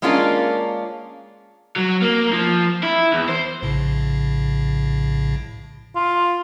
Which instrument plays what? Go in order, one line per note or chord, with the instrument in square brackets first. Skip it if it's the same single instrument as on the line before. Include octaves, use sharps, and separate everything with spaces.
[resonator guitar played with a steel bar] G#3 A#3 C#4 D4 F4 A#4
[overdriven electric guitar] F#3
A#3
F3
E4
E2
C5
[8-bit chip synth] A#1 A2 C#3
[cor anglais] F4